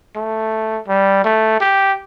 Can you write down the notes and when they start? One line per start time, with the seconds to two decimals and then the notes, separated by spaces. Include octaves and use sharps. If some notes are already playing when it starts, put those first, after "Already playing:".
0.15 A3
0.88 G3
1.24 A3
1.60 G4